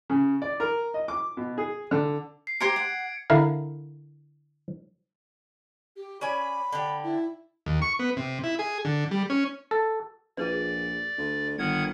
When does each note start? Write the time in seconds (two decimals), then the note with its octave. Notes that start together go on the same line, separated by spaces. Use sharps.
0.10 C#3
0.42 D5
0.60 A#4
0.94 D#5
1.08 D6
1.37 B2
1.58 G#4
1.91 D3
2.47 C7
2.60 G4 C5 A#5 G#6 C#7 D7
2.76 F#5
3.30 D3 E4 A#4 E5 F5
5.96 G4
6.21 C#4 D5 G#5 B5
6.73 D3 G4
7.03 E4
7.66 D#2
7.82 C#6
7.99 B3
8.17 C3
8.44 E4
8.59 G#4
8.85 D3
9.11 G3
9.30 C#4
9.71 A4
10.37 A#1 F4 G#4 B4 D5
11.18 D2
11.58 G1 D#3 F#5 G#6